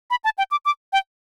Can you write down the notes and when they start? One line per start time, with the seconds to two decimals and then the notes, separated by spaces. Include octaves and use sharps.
0.10 B5
0.24 A5
0.38 G5
0.51 D6
0.65 D6
0.93 G5